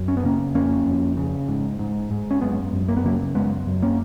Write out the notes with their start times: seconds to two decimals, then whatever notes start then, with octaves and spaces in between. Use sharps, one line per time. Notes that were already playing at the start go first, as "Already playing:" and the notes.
Already playing: F#2
0.08 C#4
0.17 B3
0.24 C#3 A#3 C#4
0.55 F2 A#3 C#4
0.86 F2
1.17 C#3
1.48 G#2
1.79 G#2
2.11 G#2
2.31 C#4
2.41 F#2 G#3 B3
2.73 F#2
2.88 A#3
2.97 B3
3.04 C#3 F#3 A#3
3.35 F#2 G#3 B3
3.67 F#2
3.82 A#3 C#4